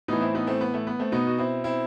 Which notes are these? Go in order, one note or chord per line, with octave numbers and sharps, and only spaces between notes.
A2 E3 B3 D#4
C4 E4
B3 D#4
A3 C4
B3
A3
B3
A3 C4
B2 B3 D#4
F#4
C4 E4
C4 E4